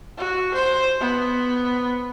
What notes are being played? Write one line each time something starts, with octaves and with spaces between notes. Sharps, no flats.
F#4
C5
B3